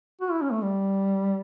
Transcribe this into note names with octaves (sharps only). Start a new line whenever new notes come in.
F#4
E4
C#4
A3
G3